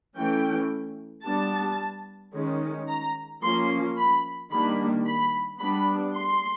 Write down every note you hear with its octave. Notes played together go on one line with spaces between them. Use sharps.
E3 A3 C#4 G5
G3 B3 D4 A5
D#3 G#3 C#4
A#5
F3 A#3 C#4 C6
B5
D#3 G3 A#3 D4 B5
B5
G3 B3 D4 B5
C6